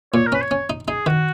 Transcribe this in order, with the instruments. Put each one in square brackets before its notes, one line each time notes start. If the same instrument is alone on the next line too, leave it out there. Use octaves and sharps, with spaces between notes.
[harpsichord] A#2 [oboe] C#5
[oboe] A#4
[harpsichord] C#4 [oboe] B4
[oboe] C#5
[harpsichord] C#4
D#4
[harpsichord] D#4 [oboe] G#4
[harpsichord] D#3 [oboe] F#4